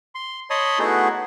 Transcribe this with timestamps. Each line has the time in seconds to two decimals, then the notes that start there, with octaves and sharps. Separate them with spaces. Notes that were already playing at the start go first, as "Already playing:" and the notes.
0.15 C6
0.50 C#5 D#5 A5 B5 C6 D#6
0.79 A3 B3 D#4 E4 F#4 G#4